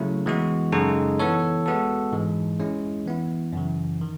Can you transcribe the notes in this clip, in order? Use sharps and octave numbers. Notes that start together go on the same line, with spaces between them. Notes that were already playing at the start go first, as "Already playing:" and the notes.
Already playing: C#3 F#3 A3 E4
E3 G#3 B3 F#4
F#2 C#3 G#3 D#4 A4
E3 B3 E4 A4 C#5
G#3 B3 F#4 A4
G#2 E3 G#3
G#3 C#4 E4
E3 B3 E4
F#2 C#3 E3
D#3